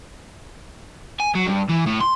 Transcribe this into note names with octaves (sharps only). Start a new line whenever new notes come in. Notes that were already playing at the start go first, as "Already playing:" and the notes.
G#5
F#3
G2
E3
A2
C6